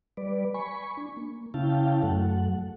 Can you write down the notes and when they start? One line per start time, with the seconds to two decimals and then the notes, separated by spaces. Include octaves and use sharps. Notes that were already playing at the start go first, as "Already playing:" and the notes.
0.17 G3 B4 D5
0.54 G#5 B5 C#6
0.97 D4
1.17 A#3
1.54 C#3 C#4 E4 F5 G5 A5
2.03 F#2 F#3 A3 A4 F#5